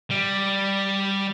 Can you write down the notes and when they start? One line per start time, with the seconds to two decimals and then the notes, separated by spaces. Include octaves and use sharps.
0.11 G3